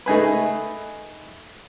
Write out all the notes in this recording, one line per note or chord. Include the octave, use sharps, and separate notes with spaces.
A3 D#4 G#4 B4